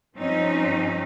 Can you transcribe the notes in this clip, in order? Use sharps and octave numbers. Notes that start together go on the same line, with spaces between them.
G2 F3 C4 C#4 D#4